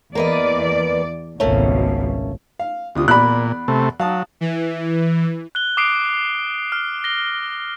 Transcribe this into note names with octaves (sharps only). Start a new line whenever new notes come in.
E2 A#3 B4 D5 D#5
G#1 C#2 B2 A3 A#3 C#4
F5
D2 C3 F4 D#6
E2 A#2 D5 B5 F#6
C3 A3
F#3 F5 A5 D#6
E3
F#6 G7
D6 D#6 C7 D7
F6
A#6 G7